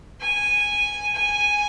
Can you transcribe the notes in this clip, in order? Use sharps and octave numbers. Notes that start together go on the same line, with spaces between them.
G#5
G#5